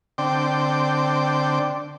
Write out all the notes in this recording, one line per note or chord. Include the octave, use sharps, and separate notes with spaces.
D3 C4 G5 D6